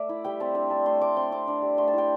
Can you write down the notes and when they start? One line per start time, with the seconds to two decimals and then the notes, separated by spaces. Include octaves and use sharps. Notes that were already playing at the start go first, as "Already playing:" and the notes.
Already playing: A3 D5 E5
0.09 E4
0.24 G3 G5
0.40 C4 A5
0.55 D4 G5
0.70 D4 A5
0.86 A3 C6
1.01 A3 D6
1.16 C4 C6
1.32 C4 D6
1.48 D4
1.62 G3
1.78 A3 C6
1.88 A5
1.93 E4 G5